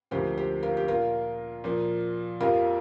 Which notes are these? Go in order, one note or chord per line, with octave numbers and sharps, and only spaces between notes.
D2 C3 F3 A#3 G4 C5
G4 C5
F4 A#4
G4
A#2 A#3 F4 A#4
A#2 F3 A#3
F2 C3 F3 A#3 F4 A#4